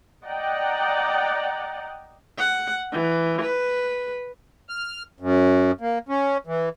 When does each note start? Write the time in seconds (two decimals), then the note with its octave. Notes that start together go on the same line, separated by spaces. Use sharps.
0.24 D5 D#5 F#5 G5 A#5
2.38 F#5
2.93 E3
3.41 B4
4.69 F6
5.20 F#2
5.81 A#3
6.09 C#4
6.47 E3